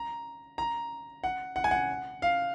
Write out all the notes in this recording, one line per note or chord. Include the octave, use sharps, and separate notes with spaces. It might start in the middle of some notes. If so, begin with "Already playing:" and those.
Already playing: A#5
A#5
F#5
F#5
G#5
F#5
F5